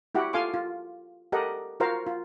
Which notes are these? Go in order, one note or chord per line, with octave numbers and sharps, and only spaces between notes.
E4 F#4 G4 F#5 G5
F4 A4 F5 G#5 C6 D6
F4
G4 A4 A#4 D#5 F#5
F4 F#4 A#4 C5 F5 A#5
F4